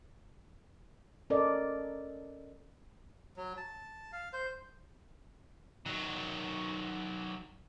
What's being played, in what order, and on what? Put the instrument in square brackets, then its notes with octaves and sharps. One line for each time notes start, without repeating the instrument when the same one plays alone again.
[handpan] C#4 A4 A#4 D5 D#5
[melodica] F#3
A5
F5
C5
[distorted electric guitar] D#3 F#3